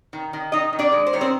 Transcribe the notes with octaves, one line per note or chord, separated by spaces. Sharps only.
D#3
D#3
D#3 D#4 D#5
D#3
D4 D5
G#3
C5
D#3 C#5
C4 C5